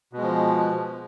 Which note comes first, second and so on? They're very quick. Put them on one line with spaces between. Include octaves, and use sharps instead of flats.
B2 G#3 F3